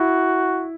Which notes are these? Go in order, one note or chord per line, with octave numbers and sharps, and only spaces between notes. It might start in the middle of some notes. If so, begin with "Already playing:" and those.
Already playing: E4 F#4